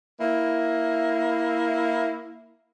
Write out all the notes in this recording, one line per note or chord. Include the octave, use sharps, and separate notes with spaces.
A#3 E4